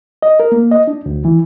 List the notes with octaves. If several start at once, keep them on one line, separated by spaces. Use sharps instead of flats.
D#5
A#4
A#3
D#5
D4
D2
E3